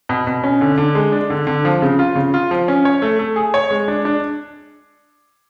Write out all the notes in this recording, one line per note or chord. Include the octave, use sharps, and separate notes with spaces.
B2
B2
C#4
D3
D3
G#3
D4
D3
D3
F3
C#3
F4
C#3
F4
F3
C#4
C#5
A3
A3
G#4
C#5
G#3
D4
D4